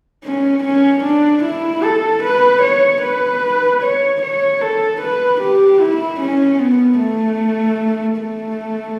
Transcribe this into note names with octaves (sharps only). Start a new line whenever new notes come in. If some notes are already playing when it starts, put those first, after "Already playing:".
C#4
C#4
D4
E4
A4
B4
C#5
B4
C#5
C#5
A4
B4
G4
E4
C#4
B3
A3
A3